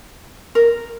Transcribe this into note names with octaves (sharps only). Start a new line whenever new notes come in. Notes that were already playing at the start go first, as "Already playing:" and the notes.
A#4